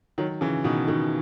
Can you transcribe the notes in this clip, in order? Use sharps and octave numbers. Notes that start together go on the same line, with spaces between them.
D#3 F#3
C#3 E3
B2 D#3
B2 D#3